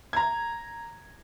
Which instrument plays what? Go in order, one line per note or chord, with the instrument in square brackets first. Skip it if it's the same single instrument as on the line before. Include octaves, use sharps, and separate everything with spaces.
[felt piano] A#5 G#6